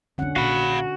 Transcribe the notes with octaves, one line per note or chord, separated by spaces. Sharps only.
F2 D3 C#4 D4 F#5
A#1 F#4 F5 B5